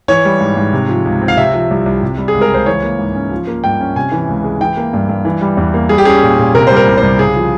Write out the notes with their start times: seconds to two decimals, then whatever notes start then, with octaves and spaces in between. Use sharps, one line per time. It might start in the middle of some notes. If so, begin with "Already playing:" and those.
0.08 E3 C#5
0.25 G3
0.40 G#2
0.57 G#2
0.73 C3
0.89 F3
1.05 C#2
1.21 C4
1.28 F5
1.37 C3 E5
1.54 F3
1.70 C2
1.86 C2
2.02 C3
2.18 G3
2.28 G#4
2.35 C#2
2.41 A#4
2.51 C#2 C5
2.66 E3 C#5
2.83 A#3
2.99 G#2
3.15 C#4
3.31 F3
3.47 A#3
3.64 G2 G5
3.80 C#4
3.96 C3 G#5
4.12 E3
4.29 C#2
4.44 G#3
4.61 E3 G5
4.77 A#3
4.93 G2
5.09 G2
5.25 E3
5.41 G3
5.57 E2
5.74 A#3
5.89 G3 G#4
5.98 G4
6.05 C#4 G#4
6.22 A#2
6.39 A#2
6.54 C3 A#4
6.67 G3 C5
6.76 A#4
6.88 C2
6.97 C5
7.03 C2
7.19 C#3 G#4
7.35 F3